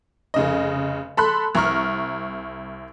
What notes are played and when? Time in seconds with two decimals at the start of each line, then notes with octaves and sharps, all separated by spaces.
0.34 F1 C#3 D#5
1.17 A4 B5 C6 F#6
1.55 C2 A#5 C#6 F6